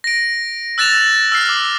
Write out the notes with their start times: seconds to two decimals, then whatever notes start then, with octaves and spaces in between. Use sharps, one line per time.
0.04 A#6 D7
0.78 E6 F#6 A6 A#6 E7 F7
1.32 E6 F6 C7
1.49 D6